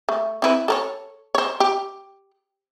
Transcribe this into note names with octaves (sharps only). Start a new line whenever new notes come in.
A3
C4 E4 B4
A4 A#4 C#5
C5 C#5
G4